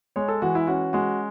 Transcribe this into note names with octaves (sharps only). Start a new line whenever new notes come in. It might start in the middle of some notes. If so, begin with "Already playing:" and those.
G#3 C#5
A4
E3 F#4
E4
C#4 F#4
G#3 F#4